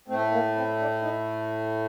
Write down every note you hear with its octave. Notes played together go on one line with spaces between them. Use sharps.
A2 A3 C4
A#3
C4
D4
D#4